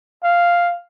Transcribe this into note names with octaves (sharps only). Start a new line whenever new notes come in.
F5